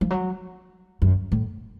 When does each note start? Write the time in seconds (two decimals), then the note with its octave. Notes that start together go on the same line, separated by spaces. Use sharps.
0.01 F3
0.10 F#3
1.02 F#2
1.32 A2